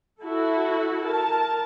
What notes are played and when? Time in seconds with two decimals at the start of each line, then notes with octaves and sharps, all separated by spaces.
0.22 E4 F#4 A4
1.07 A#4 A5